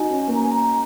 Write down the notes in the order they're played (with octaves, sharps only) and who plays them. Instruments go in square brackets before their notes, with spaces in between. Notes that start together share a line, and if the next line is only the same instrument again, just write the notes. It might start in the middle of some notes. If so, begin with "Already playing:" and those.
Already playing: [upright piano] D#4 F#4 [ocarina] G#5
[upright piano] C#4
A#3
[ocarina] A#5
G#5
A#5